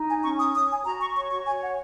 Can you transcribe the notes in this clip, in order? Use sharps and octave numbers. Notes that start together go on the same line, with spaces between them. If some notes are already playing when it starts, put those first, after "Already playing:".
Already playing: D#4
G#5
C#4 C#6
D#6
C#5 D#6
G#5
F#4 A#5
C#6
C#5 C#6
C#6
C#5 G#5
F#5